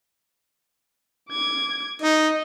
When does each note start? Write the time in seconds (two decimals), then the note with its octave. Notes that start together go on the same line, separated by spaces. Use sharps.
1.31 D6 G#6
2.02 D#4 D#5